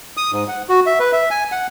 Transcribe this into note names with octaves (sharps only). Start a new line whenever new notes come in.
D#6
G#2
F#5
F#4
E5
B4
E5
G#5
F#5